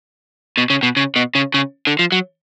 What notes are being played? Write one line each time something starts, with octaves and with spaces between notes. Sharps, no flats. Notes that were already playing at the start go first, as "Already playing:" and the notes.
B2
C#3
B2
C#3
B2
C#3
C#3
D3
F3
F#3